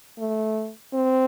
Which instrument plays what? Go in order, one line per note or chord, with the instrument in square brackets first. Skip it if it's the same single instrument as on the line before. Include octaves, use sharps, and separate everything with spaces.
[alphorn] A3
C4